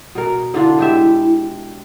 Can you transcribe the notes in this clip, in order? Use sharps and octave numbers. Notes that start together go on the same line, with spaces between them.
B2 A#4
D3 D4 E4 F4
G#3 G4 E5